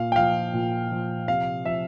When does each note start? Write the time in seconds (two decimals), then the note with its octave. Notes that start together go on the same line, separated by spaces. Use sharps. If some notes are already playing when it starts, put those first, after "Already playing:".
Already playing: A#2 F5
0.12 G5
0.16 F3 F5
0.53 A#2
0.91 F3
1.28 C3 F5
1.65 F3 E5